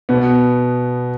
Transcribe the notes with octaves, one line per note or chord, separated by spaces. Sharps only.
B2 B3